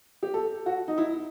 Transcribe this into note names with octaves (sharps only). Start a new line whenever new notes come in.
G4
A4
F#4
D#4
E4